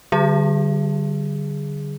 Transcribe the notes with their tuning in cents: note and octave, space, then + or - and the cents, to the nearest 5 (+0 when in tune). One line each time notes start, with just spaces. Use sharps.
D3 +0 G3 -25 G#4 -5